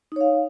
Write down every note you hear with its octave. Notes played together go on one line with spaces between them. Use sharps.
D#4 C#5 F5